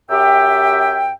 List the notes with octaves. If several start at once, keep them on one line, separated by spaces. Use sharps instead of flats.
F#2 G4 E5 G5